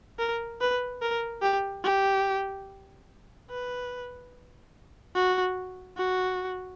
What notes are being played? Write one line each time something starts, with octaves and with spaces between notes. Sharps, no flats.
A#4
B4
A#4
G4
G4
B4
F#4
F#4